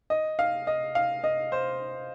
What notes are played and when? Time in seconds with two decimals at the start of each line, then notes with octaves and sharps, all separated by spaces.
0.10 D#5
0.39 F5
0.67 D#5
0.95 F5
1.24 D#5
1.52 C5